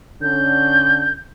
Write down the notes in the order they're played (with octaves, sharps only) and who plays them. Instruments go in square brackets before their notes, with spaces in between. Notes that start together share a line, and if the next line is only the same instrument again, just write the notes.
[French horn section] D3 C#4 [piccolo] G6